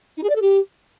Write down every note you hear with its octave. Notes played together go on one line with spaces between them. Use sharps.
D#4
G#4
D5
A4
G4